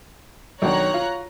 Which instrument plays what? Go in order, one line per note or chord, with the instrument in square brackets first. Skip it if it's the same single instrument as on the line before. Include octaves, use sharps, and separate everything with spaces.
[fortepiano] B1 D#3 D4 [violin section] C#5 A#5 F#6
[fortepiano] F4